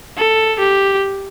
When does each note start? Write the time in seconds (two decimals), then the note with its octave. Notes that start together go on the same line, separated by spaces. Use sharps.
0.17 A4
0.59 G4